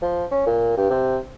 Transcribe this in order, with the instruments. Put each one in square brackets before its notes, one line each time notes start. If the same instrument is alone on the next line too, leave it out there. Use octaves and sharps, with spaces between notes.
[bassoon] F3
C#4
A#2
G2
C3